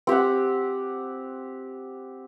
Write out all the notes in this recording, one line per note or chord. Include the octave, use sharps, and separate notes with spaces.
C4 G4 C5 F#5